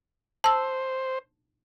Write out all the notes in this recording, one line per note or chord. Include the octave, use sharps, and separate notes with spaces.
C5 A5 E6